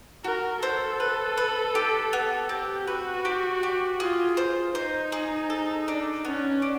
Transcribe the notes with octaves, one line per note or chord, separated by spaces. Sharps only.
F#4 A#4
A4 C5
B4
B4
G4
B3
C4 G4
F#4 B4
G4
G4
F4 G#4
F4 C5
D#4 C5
G#4
A4
D4
B3 C#4
D4